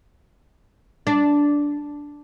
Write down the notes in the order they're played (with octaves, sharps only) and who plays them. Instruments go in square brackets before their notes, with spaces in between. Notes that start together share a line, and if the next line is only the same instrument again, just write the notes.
[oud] D4